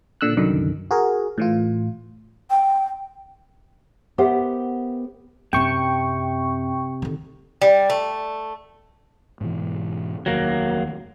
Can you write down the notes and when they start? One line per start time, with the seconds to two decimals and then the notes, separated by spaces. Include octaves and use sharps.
0.21 A#2 D3 E6 F#6
0.37 C2 F#2 D3 D#3
0.91 F#4 G#4 A#4
1.38 A2 E3 F4
2.51 G5
4.18 B3 G4 A#4 C5 E5 F#5
5.53 F#2 C3 C4 G5 C#6
7.02 D3 D#3
7.62 G3
7.90 A3
9.41 G#2 B2 E3
10.26 F1 D#2 F#3 A#3